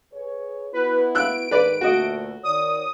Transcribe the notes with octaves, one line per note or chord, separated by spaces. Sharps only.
G#4 B4 C#5
B3 E4 F#4 B4
E6 F#6 D7
G#2 D#3 B4 D5
D2 A#2 A3 F#4 D#5
D#3 C#5 D5 D#6